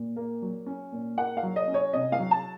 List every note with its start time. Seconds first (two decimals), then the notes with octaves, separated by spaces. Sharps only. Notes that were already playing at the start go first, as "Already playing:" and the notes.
Already playing: A#2
0.16 A#3
0.42 F#3
0.66 C#4
0.92 A#2
1.18 A#3 F#5
1.37 F5
1.43 F#3
1.56 D#5
1.68 C#4
1.74 C#5
1.93 C3 D#5
2.12 F5
2.19 F#3
2.31 A5